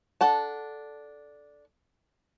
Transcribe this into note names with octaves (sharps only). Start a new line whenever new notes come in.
D4 A4 F#5 A5